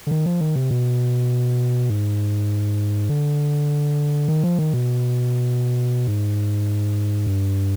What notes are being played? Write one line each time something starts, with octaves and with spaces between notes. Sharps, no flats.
D3
D#3
F3
D#3
C3
B2
G#2
D3
D#3
F3
D#3
B2
G#2
G2